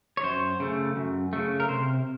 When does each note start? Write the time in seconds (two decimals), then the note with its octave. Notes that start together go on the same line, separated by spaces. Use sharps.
0.17 C#5
0.23 F#2 C5
0.60 C#3 A3
0.96 F#2
1.33 C#3 A3
1.60 A#4
1.69 C3 C5